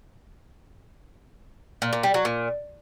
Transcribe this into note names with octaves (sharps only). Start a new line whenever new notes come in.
A#2
A#2
G3
F#3
A#2